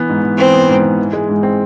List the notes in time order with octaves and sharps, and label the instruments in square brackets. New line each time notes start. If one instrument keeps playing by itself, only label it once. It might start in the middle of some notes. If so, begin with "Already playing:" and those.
Already playing: [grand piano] E3 B3
G#2
G#2
[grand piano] E3 [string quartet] C4
[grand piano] B3
G#2
G#2
E3
G#3
G#2
C4